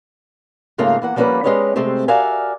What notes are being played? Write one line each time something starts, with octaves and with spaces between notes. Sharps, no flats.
G#2 C#3 A3 A#3 F4 C#5
E3 A#3 F#5
F3 G3 A#3 C#4 B4 F#5
G#3 C#4 G4 B4 C#5 D#5
C3 G#3 A3 C4 G4
F#4 A#4 D5 E5 F5 G#5